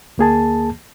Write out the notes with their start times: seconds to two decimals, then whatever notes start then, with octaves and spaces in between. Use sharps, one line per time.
0.18 D2 A#3 G#4 A5